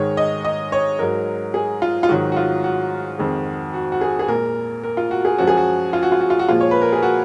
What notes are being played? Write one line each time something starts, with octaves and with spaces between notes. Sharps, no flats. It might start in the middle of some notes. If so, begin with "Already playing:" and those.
Already playing: G#2 D#3 G#3 C#5
D#5
D#5
C#5
G#2 F#3 A#4
G#4
F4
F4
G#2 D#3 F#3 F#4
F#4
F4
F#4
F2 D#3 G#3
F#4
F#4
G#4
G#4
A#2 G#3 A#4
A#4
F4
F#4
G#4
F#2 F3 G#3 F#4
G#4
F#4
F4
F#4
F4
F#4
F4
F#4
A#2 F3 G#3 F4
C#5
B4
A#4
G#4
F#4